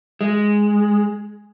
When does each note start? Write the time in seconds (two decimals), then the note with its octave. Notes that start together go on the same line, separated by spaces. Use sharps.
0.21 G#3